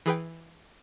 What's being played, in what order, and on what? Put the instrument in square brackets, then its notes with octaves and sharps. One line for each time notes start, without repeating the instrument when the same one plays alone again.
[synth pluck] E3 G#4 B4 G5